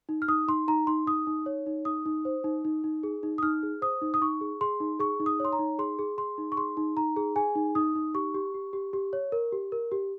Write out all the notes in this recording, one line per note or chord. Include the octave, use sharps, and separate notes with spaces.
D#4
F6
D#4 D#6
D#4 C6
D#4 A#5
D#4 C6
D#4 D#6
D#4
C#5
D#4
D#4 D#6
D#4
C5
D#4
D#4
D#4
G#4
D#4
D#6
D#4 F6
G#4
C5 D#6
D#4
D#6
D#4 C#6
G#4
G#4 C6
D#4
G#4 C#6
D#4
D#6
C#5 C6
A#5
D#4
G#4 C6
G#4
G#4 C6
D#4
C#6
G#4 C6
D#4
D#4 A#5
G#4
G#4 G#5
D#4
D#4 D#6
D#4
G4 C#6
G4
G4
G4
G4
C#5
A#4
G4
A#4
G4